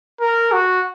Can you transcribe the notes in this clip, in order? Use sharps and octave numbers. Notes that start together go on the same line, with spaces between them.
A#4
F#4